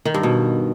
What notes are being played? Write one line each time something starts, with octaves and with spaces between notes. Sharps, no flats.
D#3
G2
B2